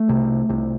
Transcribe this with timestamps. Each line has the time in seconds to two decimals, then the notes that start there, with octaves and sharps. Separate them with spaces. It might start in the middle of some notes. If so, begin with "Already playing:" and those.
Already playing: A3
0.09 C2 C3
0.49 C2 C3